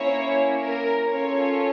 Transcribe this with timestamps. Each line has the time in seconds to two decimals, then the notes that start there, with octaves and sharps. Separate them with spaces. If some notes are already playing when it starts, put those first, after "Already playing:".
Already playing: A#3 C#4 E4 C#5
0.63 A#4
1.08 C#4 F4 A4 C#5